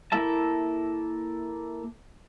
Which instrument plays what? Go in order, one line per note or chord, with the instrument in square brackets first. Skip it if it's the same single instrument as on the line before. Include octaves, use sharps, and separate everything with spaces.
[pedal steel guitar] A#3 E4 A4 E5 A5